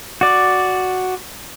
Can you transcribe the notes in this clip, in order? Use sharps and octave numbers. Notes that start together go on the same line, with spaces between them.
F#4 D5